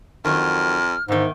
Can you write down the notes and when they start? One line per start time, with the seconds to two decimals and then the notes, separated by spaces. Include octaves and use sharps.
0.25 F2 D#3 F#3 F6
1.08 E2 G#2 D#3